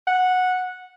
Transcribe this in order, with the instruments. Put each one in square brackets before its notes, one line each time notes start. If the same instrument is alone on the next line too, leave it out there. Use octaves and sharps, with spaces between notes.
[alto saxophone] F#5